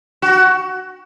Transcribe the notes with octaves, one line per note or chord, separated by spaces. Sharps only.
F#4